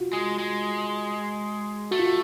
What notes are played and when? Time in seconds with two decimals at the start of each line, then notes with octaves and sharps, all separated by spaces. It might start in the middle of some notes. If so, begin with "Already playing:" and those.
Already playing: F4 F#4
0.13 G#3
0.39 G#3
1.91 A3 F#4
1.99 F4
2.06 F#4